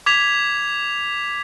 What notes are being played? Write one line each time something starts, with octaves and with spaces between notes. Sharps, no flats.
D6 G#6 B6 F7